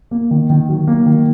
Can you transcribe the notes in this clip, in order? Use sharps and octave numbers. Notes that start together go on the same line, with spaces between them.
A#3
D#3
D#3
F#3
A#3
D#3